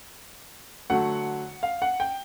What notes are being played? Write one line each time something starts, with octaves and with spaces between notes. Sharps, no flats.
D3 F#3 A3 F#5
F5
F#5
G5